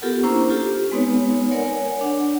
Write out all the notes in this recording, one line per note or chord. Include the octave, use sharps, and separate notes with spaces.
B3 F4 G4 A4 A#4 F#5
A#3 C#4 D4 E4 C5 A#5
F4 G4 A4
G#3 B3 C4 D#4 B4 C#5
A#4 C#5 D5 F#5 G#5
D4 F#5